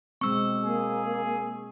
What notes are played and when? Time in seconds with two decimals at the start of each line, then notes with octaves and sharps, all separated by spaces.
0.21 B2 G#3 C4 C#6 E6
0.64 A#3 G#4